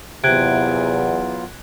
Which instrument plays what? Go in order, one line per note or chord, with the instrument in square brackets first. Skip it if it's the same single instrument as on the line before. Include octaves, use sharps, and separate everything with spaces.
[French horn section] E2 [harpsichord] C3 [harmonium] F#3 B3 F4 [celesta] F#6 G#6 D7